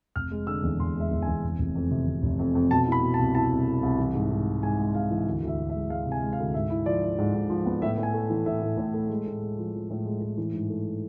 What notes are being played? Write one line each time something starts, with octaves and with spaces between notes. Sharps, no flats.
F1 F6
G#3
D3 E6
E2
F1 C6
G#3 E5
E2
G#5
E2
F1
F1
F2
C3
C3
F1
F2
F2
B2 A5
E4
B5
B2
A5
C2
E4 A5
C2
E4
C2
E3
G#2
G#2
G#3
G#2 G#5
G#3
G#2 F5
E3
D2
D2
E5
D2
E5
G#3
G#3 F5
C3
G#5
G#3
F5
D2
G#2 E5
E4
F3 D5
E4
G#2
G#2
F3
B3
A2 E5
A2
G#5
A3
E3
A2 E5
A2
A2
A3
G#3
A2
G#3
F3
F3
A2
G#3
A2
E3
G#2
A3